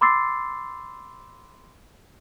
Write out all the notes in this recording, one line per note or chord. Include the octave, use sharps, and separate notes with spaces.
B5 C6 D6 E6 A6 C7